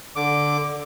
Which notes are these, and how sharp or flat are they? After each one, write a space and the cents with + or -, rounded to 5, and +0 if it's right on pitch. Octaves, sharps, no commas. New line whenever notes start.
D3 +0 D6 +0